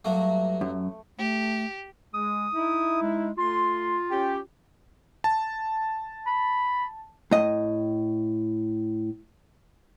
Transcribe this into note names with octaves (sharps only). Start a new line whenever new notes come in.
G2 F#3 A3 A#3
F#2
A3 G4
G#3 D#6
D#4 E4
G#3
A3 F4 C6
C#4 G4
A5
B5
A2 D#5